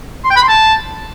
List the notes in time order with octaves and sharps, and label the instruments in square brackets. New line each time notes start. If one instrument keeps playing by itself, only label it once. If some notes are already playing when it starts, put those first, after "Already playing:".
[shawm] C6
G5
B5
C6
A5